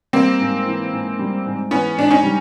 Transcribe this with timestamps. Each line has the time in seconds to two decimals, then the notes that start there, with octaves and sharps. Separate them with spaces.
0.13 G3 A#3 C4
0.40 G#2
0.66 E3
0.92 G#2
1.19 G3
1.45 G#2
1.71 E3 B3 C#4
1.97 G#2 D4
2.10 C#4 D#4
2.23 G3